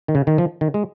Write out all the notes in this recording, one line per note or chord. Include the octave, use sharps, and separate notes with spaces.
D#3
C#3
D#3
F3
D#3
G#3